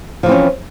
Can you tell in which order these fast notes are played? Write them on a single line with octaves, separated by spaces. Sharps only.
F3 E3 C4 C#4